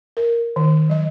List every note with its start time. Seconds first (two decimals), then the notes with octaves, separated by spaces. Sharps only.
0.17 A#4
0.56 D#3
0.89 F#3 D#5